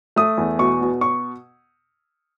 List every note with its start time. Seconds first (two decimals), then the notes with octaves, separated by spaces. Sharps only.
0.16 A3 D#6
0.38 E2
0.59 B2 C#6
0.81 B2
1.01 C#6